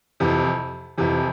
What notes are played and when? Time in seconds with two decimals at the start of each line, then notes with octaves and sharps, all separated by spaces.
0.20 F2 C3 E3
0.98 F2 C3 E3